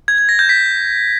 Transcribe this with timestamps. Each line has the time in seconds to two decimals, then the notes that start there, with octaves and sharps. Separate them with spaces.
0.08 G#6
0.18 G#6
0.29 A#6
0.39 G6
0.49 B6